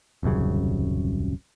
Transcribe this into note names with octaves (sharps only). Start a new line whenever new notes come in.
D#1 C2 F#2 C#3